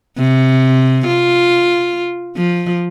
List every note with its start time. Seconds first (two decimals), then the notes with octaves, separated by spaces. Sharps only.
0.18 C3
1.07 F4
2.36 F3